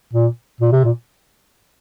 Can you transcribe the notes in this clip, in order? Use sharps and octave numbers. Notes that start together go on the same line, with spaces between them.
A#2
A#2
C3
A#2